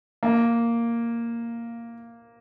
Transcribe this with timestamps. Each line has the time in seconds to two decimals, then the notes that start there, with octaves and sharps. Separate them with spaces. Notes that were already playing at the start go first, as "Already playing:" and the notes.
0.23 A#3